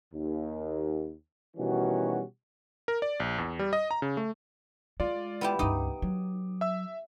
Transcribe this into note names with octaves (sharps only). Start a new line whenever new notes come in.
D#2
B2 D#3 E3 G3 C#4 F#4
A#4
D5
A#1
E2
G3
D#5
A#5
C#3
A3
G#3 F4 D5
B3 E4 G4
C#2 G2 D#4 D6 D#6
F#3
E5 E6